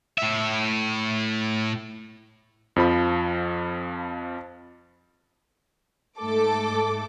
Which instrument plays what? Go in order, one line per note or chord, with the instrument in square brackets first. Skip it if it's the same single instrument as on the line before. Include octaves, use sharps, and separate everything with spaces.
[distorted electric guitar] A2 E5
[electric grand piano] F2 F3 B5
[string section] G#2 A3 A4 D6